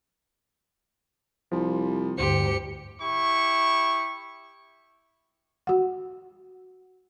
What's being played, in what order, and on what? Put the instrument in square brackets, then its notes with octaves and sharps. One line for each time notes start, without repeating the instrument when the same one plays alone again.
[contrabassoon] C2 [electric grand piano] F3
[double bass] D2 G2 [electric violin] G4 C#7 [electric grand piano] C5 C6
[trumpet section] E4 G4 C#6
[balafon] F#4 F#5